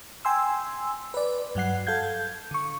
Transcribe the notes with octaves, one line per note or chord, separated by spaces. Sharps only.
G5 G#5 C6 E6
B4 D5
G2 F#3 F#5 C7
A4 F5 G6 G#6
D3 C#6